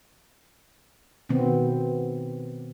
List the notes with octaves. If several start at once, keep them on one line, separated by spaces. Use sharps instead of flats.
B2 D#3 B3 C4